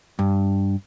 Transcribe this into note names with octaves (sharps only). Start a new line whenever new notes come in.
G2